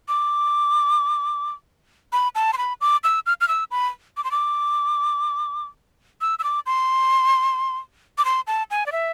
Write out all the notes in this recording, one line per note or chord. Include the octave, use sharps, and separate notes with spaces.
D6
B5
A5
C6
B5
D6
E6
F6
F6
E6
B5
D6
C6
D6
E6
E6
D6
C6
D6
C6
A5
G#5
D5
E5